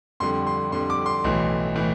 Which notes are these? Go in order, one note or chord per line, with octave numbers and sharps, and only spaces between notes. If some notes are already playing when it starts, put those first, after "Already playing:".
F2 D3 G3 C6
C6
F2 D3 G3 C6
D6
C6
B1 A2 E3
A2 E3